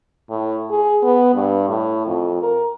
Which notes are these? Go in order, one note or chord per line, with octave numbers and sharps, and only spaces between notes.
A2
G#4
B3
G2
A2
F2
A#4